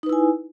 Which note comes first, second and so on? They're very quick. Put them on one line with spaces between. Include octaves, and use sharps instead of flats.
D#4 B4 E4 G#5